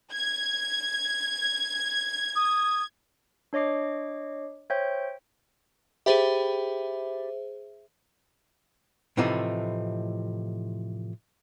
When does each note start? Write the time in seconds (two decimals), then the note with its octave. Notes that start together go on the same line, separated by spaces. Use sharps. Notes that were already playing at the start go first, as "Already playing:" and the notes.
0.13 G#6
2.36 D#6
3.53 D4 C#5 D#5 D6 C7
4.70 C5 C#5 E5 G5 G6
6.06 G4 G#4 C5 E5 B5 A6
9.17 A2 C3 E3 F3 A3 D#4